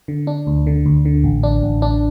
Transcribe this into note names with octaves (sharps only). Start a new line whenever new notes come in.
D3
D4
D2
D3
D2
D3
A1
D4
A1
D4